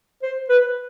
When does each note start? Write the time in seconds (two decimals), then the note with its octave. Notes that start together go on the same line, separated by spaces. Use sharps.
0.23 C5
0.49 B4